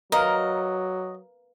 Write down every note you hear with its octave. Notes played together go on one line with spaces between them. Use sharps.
F#3 A#4 B4 D#5 F5 A#5